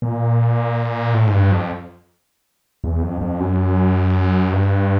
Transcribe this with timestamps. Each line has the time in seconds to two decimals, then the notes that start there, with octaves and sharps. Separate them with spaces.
0.02 A#2
1.14 A2
1.27 G#2
1.33 G2
1.52 F2
2.84 E2
3.02 F2
3.21 F2
3.39 F#2
4.52 G2